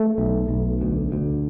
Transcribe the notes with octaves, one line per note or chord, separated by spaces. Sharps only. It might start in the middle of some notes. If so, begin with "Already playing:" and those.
Already playing: A3
B1
B1
D2
D2